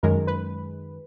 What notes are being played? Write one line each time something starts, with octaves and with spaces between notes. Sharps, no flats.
F#2 D#3 G#3 A#4
B4